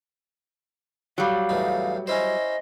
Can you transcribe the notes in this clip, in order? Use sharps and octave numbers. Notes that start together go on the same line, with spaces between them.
F#3 G3 F5
E2 A2 D#4
C#4 E4 C5 D#5